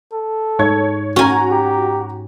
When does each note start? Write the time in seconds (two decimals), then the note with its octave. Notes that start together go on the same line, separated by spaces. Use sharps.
0.12 A4
0.59 G#2 C#5 G#6
1.16 C#4 F#4 G#5 A#5
1.51 G4